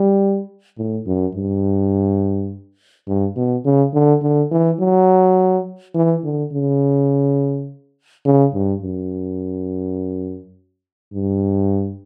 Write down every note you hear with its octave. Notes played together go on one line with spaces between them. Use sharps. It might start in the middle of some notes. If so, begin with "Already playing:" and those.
Already playing: G3
A2
F#2
G2
G2
B2
C#3
D3
D3
E3
F#3
E3
D3
C#3
C#3
G2
F#2
G2